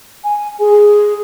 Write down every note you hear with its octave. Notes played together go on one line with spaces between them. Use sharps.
G#5
G#4